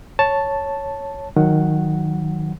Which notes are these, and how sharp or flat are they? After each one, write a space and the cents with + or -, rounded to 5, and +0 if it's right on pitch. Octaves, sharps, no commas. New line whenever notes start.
C#5 +0 A5 +0
D#3 +0 F#3 -15 F#5 +0